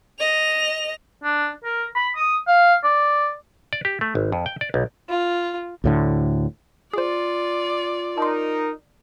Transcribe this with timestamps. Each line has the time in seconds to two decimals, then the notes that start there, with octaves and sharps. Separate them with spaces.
0.19 D#5 F7
1.24 D4
1.65 A#4
1.95 B5
2.16 D#6
2.48 F5
2.84 D5
3.73 D5
3.85 G4
4.01 A3
4.15 G#1
4.32 F2
4.46 G5
4.61 D5
4.74 B1
5.09 F4
5.84 D2 A2 D3
6.93 F4 G#4 C5 D5
8.18 D#4 A#4 A5 C6